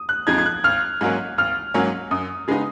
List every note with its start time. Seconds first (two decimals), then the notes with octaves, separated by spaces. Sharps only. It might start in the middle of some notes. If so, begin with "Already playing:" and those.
Already playing: D#6
0.09 F#6
0.27 F2 F3 G#3 D#4 G#6
0.38 G#6
0.46 F#6
0.64 G#1 F6
1.01 G#2 F#3 A#3 C#4
1.38 G#1 F6
1.74 G#2 F#3 A#3 C#4
2.11 F#2 D#6
2.48 C#3 G#3 B3 D#4